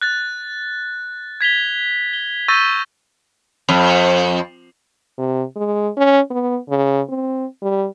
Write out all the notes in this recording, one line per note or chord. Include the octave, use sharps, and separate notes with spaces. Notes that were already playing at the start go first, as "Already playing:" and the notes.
F#6 A6
G#6 B6 F7 G7
G7
C#6 E6 G6 A6 A#6 D#7
F2
C3
G#3
C#4
B3
C#3
C4
G3